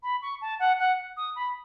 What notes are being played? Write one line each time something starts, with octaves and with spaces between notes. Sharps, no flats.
B5
C#6
A5
F#5
F#5
D#6
B5